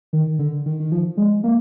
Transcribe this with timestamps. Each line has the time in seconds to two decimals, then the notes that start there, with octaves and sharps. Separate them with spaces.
0.13 D#3
0.39 D3
0.66 D#3
0.80 D#3
0.92 F3
1.17 G#3
1.44 A#3